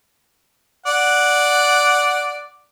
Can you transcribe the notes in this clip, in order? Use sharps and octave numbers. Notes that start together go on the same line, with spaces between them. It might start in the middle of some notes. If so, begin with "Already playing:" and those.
D5 F#5